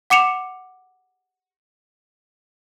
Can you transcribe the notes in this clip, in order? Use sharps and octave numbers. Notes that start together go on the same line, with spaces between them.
F#5 D6 C#7 E7 F7